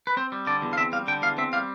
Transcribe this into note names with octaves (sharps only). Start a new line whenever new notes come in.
B4
C4 C5
G3
D3 D5
E2
F5
C4 E5
G3 F5
D3 G5
E2 F5
C4 E5
G3 F5